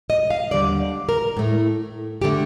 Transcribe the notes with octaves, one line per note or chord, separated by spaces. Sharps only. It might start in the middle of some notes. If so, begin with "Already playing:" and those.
D#5
F5
D#2 D3 G3 D5
A#4
A2 A3
D3 A3 G4